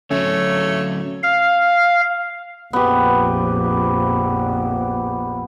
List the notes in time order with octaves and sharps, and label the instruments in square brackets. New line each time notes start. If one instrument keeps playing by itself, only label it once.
[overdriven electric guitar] D2 F#3 [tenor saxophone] A3 [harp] C#4 [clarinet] C#5
[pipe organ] F5
[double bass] A#1 F2 [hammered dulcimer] B3 G4